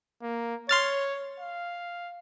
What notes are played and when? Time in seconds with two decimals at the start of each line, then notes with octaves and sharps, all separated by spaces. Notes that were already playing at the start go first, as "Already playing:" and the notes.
0.22 A#3
0.69 C#5 C6 F6 A6
1.40 F5